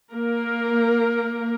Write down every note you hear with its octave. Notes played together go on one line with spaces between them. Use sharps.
A#3 A#4